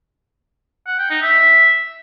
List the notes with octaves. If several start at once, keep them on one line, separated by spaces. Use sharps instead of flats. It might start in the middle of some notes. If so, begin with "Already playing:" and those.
F#5
G5
D#4
E5